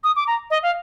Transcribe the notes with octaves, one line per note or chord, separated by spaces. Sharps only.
D#6
D6
A#5
D#5
F5